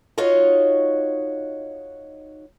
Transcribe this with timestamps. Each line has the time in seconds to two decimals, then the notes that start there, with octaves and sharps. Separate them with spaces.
0.18 D#4 F4 F#4 C#5 D#5